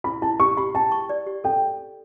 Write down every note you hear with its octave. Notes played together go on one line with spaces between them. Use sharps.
E4 B5
E4 A5
G4 C#6
G4 B5
G5 A5
C#6
D5
G4
A4 G5